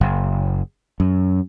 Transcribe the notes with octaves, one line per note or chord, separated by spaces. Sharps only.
F#1
F#2